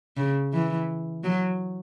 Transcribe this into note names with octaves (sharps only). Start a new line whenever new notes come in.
C#3
E3
F#3